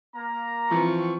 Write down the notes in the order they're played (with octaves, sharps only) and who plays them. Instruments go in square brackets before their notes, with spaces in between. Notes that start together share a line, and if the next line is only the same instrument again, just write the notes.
[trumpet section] A#3 A#5
[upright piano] E3 [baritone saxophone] F3 [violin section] C4 C#6